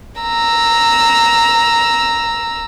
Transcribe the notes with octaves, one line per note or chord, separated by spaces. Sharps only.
A#5 E6